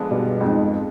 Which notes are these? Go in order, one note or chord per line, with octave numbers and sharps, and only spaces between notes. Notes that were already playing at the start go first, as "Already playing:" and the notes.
Already playing: D3 F3 G#3 B3 D4
G2 B2
F2 G#2